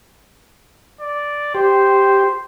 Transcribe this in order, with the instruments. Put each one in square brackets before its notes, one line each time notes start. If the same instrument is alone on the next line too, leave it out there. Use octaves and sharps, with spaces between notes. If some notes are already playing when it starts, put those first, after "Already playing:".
[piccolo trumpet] D5
[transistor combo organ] G4 [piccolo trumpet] C5